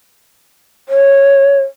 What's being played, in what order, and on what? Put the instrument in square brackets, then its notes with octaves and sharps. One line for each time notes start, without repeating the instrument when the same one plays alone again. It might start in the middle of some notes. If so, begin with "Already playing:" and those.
[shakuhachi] C#5